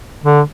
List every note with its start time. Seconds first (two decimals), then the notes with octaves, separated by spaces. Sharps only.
0.24 D3